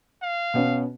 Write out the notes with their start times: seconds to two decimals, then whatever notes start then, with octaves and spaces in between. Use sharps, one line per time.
0.22 F5
0.54 B2 B3 C#4